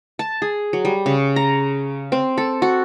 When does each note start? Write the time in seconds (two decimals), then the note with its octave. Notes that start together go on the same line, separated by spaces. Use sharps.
0.19 A5
0.42 G#4
0.73 F#3
0.85 G3
1.06 C#3
1.36 A#5
2.12 C4
2.38 A4
2.62 F#4